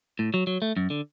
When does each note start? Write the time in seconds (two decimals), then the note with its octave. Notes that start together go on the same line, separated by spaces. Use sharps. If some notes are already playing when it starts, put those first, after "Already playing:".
0.19 A2
0.34 F#3
0.47 F#3
0.62 A3
0.77 F#2
0.90 D3